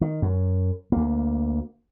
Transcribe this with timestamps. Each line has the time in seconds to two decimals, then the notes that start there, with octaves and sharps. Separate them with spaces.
0.01 D#3
0.22 F#2
0.92 D2 A#3